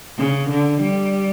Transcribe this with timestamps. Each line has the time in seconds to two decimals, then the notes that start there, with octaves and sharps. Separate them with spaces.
0.18 C#3
0.49 D3
0.82 G3